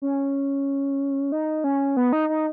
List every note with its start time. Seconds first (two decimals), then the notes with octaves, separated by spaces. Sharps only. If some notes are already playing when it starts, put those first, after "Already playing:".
0.02 C#4
1.32 D#4
1.64 C#4
1.97 B3
2.13 D#4
2.29 D#4